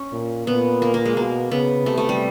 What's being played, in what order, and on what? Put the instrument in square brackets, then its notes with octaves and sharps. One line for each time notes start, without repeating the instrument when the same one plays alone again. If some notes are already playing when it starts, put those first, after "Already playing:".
Already playing: [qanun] C#4
[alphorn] A#2
[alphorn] A#2 [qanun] B3
[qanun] A#3
A#3
G#3
[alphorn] B2 [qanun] A#3
[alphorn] C#3 [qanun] B3
[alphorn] C3 [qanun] A3
[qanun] A3
G3